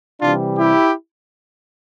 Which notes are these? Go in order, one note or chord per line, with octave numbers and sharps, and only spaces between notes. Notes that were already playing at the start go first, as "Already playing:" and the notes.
C3 E3 G3 D4 F4
E4 G4